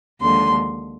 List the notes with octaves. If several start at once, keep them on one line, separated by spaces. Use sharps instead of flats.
D#2 D3 F3 G#3 C6